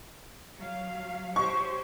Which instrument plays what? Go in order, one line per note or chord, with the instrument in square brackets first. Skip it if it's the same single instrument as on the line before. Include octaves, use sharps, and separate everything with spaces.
[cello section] F#3 F5
[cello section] G4 C5 C#5 [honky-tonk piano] C#6